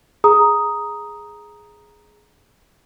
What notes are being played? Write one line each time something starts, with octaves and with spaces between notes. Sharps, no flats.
G#4 A#5 D#6